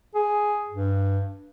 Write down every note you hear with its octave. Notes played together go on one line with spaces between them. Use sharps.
G#4
G2